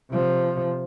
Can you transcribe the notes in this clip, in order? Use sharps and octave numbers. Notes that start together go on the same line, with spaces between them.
C3 F3